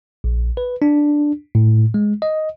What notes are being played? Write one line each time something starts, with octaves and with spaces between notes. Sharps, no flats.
A#1
B4
D4
A2
G#3
D#5